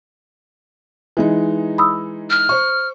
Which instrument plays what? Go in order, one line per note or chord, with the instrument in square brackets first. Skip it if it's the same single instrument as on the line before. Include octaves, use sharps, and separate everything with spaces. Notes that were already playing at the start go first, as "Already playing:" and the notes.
[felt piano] E3 G#3 D#4
[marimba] B5 D#6 E6
[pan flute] F6
[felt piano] C5 C#6